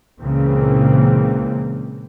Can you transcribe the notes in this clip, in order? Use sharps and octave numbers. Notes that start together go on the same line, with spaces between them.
C#2 A#2 C#3 E3 A#3 C4